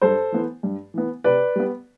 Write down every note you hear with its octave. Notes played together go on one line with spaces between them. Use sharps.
G2 A4 C5
E3 B3
G2
E3 B3
C3 B4 D5
G3 B3